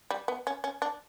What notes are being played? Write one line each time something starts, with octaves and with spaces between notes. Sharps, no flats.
G3
B3
C#4
C#4
D4